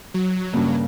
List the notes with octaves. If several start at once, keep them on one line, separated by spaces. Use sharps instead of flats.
F#3
G2 C#3 A#3